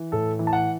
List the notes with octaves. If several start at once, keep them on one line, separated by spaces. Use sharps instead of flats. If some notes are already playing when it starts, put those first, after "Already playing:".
Already playing: E3
A2 A4
E3
A5
F#5